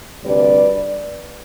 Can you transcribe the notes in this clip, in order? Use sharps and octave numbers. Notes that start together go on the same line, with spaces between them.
D2 C3 G3 D4 B4 D5